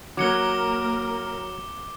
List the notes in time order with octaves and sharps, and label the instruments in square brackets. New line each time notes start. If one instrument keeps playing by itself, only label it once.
[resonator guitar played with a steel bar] F#3 [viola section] A#3 A#4 [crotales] D6 C#7 G7